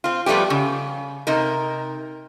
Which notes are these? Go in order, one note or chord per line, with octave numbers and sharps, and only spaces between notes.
C4 F4
F3 G3 A3 B3 G4
C#3
C3 D#4 A#4